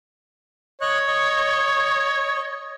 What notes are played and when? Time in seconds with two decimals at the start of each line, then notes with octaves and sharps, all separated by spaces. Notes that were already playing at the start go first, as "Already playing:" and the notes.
0.81 C#5 D#5 C#6 F#6
1.07 D#5 C#6